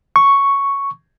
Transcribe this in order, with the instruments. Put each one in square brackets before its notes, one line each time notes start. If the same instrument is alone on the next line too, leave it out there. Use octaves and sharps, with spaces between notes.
[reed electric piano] C#6